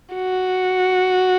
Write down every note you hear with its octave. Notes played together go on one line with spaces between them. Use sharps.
F#4